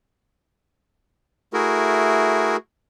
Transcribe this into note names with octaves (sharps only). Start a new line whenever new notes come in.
A3 E4 F#4 G#4 A#4